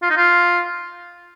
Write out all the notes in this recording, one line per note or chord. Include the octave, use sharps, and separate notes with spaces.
F4
D#4
F4